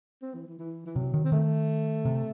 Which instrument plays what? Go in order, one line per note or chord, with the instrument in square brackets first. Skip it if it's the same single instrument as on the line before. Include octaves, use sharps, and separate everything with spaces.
[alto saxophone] C4
E3
E3
E3
E3
[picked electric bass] C3 [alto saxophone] F#3
[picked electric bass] D#3
[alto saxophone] C4
[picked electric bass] D#3 [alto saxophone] A3
[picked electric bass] C3